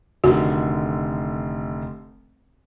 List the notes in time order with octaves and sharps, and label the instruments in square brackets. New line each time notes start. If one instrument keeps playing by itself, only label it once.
[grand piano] F1 D3 D#3 [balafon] F#4